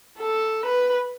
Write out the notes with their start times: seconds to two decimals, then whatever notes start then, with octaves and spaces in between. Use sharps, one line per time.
0.19 A4
0.66 B4